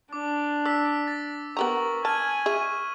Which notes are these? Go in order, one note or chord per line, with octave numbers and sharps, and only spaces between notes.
D4 D6
D5 E6 B6
A6
B3 G4 A#4 A#5 C#6 F#7
G#5 A5 F6 G#6
G#4 E5 C#6 D#7